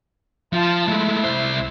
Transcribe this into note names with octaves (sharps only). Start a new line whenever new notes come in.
F3 F4 A5
G#3 A3 E4
C2 C5